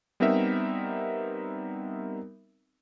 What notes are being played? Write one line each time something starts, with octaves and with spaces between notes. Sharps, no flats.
G3 B3 C4 D#4 A#4 E5